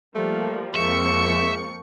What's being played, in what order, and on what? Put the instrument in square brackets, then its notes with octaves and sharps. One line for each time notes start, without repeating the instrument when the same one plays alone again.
[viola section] F3 G3 A#3 [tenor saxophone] A3
[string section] F2 C#6 C#7 [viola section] F3 A#3 C4 [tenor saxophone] G#3 [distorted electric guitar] E5